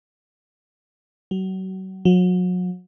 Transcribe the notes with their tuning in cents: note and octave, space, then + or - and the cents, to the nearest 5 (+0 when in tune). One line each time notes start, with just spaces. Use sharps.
F#3 +35
F#3 -35